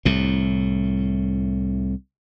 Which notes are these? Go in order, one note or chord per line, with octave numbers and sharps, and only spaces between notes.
C2 A2